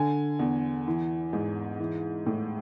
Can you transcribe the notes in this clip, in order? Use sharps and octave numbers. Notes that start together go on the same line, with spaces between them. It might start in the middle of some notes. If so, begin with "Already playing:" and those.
Already playing: D3 G#5
E2
E3
G#2
E3
A2